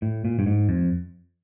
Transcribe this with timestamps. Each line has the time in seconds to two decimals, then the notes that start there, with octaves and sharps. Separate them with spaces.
0.02 A2
0.25 A#2
0.39 G2
0.46 G#2
0.69 F2